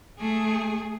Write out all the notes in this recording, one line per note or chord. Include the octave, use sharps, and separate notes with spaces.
A3 G#4